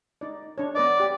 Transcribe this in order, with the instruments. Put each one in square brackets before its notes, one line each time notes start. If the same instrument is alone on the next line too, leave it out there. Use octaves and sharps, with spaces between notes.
[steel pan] D#4 D5
D4 C#5
[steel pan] B3 B4 D#5 [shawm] D5
[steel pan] G4